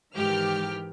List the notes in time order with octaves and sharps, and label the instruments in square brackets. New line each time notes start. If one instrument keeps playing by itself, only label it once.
[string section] G#2 D#3 E3 G4 F6